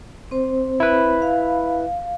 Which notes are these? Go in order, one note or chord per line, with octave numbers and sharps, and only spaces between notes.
C4 C5
E4 B4
F5